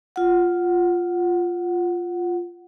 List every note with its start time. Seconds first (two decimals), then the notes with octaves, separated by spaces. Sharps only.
0.16 F4 F#5